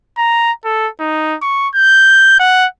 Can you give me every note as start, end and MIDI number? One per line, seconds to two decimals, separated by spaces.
0.18 0.51 82
0.64 0.88 69
1.00 1.36 63
1.41 1.68 85
1.75 2.39 91
2.39 2.66 78